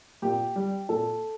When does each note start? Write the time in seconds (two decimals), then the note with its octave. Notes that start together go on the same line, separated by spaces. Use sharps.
0.22 A#2 G4
0.56 G3
0.89 A#2 A4